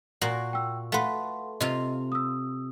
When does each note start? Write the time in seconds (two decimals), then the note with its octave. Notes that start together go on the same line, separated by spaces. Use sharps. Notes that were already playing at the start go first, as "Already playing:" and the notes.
0.21 A#2 A#3 F#4
0.53 G5 E6
0.92 A3 B4 F5 F#5 C6
1.60 C3 F4 D#5
2.12 D#6 E6